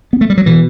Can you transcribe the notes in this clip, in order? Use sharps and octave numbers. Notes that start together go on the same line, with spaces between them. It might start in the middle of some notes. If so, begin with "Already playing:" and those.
B3
A3
G3
F#3
B2 E3